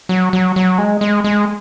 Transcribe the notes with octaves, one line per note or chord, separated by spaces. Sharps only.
F#3
F#3
F#3
G#3
G#3
G#3